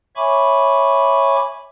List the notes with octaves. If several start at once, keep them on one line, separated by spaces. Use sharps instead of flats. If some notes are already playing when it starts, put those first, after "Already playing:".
C#5 E5 G#5 B5 C#6 D6